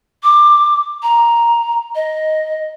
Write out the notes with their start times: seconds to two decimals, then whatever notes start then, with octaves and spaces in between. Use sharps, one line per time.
0.23 D6
1.03 A#5
1.95 D#5